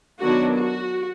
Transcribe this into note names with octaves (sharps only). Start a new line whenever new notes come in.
D#3 F#3 B3 D4 F#4
F#4